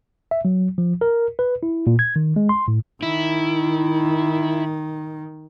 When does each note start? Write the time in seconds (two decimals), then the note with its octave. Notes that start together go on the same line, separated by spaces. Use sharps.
0.31 E5
0.45 F#3
0.78 F3
1.01 A#4
1.39 B4
1.63 E4
1.87 A#2
1.99 G#6
2.16 D#3
2.36 G#3
2.49 C6
2.68 A2
3.03 D#3 E4